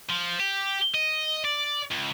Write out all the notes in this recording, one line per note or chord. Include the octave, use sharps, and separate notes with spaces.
F3
G4
D#5
D5
C#2